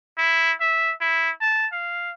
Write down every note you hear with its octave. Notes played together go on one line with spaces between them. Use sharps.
E4
E5
E4
A5
F5